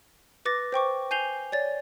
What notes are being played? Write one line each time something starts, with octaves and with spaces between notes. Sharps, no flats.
B4 D6 A6 A#6
C5 G5 C#6 D6
G#5 G6 C7 F7 G7
C#5 D5 A6